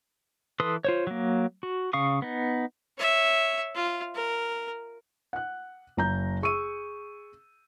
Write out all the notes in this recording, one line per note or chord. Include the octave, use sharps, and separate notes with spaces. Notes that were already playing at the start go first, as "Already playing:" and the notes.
E3 A4 B4 C6 D#6
F4 C5 C#5
F#3 A#3
F#4
C#3 F5 C#6 D#6
B3 D#4
C#5 E5
F4
A#4
F#5 F#6
F#1 A#5 G6
G#4 C#6 E6 D#7